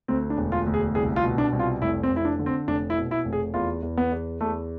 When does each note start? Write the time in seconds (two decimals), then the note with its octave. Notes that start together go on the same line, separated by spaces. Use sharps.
0.08 D2 C4
0.30 D4
0.37 E1
0.52 F4
0.66 D2
0.74 G#4
0.95 C2 G#4
1.16 F4
1.24 B2
1.38 D4
1.53 C2
1.60 F4
1.82 F1 E4
2.03 C4
2.10 F1
2.16 E4
2.25 D4
2.39 D3
2.46 C4
2.67 F1 D4
2.90 E4
2.97 B2
3.11 E4
3.25 F1
3.33 G#4
3.54 E2 F4
3.83 E2
3.97 B3
4.12 E2
4.41 E2 A3